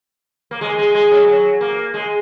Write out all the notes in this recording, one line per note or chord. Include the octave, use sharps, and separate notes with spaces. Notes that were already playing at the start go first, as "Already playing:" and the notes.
A#3
G#3
G#3
G#3
F#3
F#3
A#3
G#3